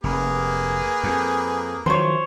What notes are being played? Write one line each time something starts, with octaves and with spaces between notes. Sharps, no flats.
F1 A#3 G#4 B4
F2
D#3 F3 F#3 C5 C#5